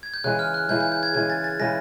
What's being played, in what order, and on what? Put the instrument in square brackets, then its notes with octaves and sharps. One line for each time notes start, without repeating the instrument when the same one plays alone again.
[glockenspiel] G#6
G6
[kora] C#3 E3 G#3 [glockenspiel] F#6
[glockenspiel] F6
F#6
[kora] C#3 E3 G#3 [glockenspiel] G6
[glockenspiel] G6
G6
G#6
[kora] C#3 E3 G#3 [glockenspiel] G#6
[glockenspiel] A6
A6
[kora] C#3 E3 G#3 [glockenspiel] A#6